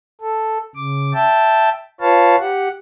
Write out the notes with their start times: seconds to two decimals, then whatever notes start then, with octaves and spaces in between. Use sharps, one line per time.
0.21 A4
0.76 C#3 D6
1.14 E5 G5 A5
2.01 F4 B4 C#5 F5 A5
2.39 G4 F#5